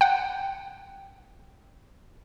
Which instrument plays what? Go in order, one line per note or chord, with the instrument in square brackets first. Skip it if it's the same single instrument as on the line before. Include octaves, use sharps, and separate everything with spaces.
[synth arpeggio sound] F#5 G5